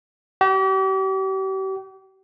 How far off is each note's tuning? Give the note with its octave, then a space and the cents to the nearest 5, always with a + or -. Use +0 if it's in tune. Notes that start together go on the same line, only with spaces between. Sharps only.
G4 -40